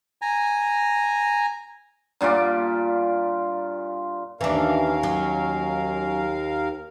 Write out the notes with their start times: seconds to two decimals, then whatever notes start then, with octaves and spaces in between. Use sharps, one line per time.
0.22 G#5 A#5
2.21 G2 A#2 F4 D5
4.41 D#2 E3 C#4 D4 A#4 F5
5.03 F#3